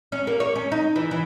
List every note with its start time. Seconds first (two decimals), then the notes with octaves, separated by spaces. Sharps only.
0.12 C#4
0.27 A#3
0.40 C#5
0.56 C#4
0.72 D#4
0.96 E3
1.11 E3